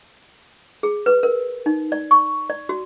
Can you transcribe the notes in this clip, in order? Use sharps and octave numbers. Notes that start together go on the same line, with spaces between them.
G#4
B4
A#4
D#4
D5
C#6
D5
F#4